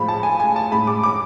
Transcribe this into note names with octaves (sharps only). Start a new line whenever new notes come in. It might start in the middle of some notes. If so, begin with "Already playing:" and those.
Already playing: A2 F3 G#3 B5
A5
G#5
G#5
A5
A2 G#3 B5
D6
D6